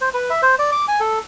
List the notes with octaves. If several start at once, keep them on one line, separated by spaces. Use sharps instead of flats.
C5
B4
E5
C5
D5
D6
G#5
A4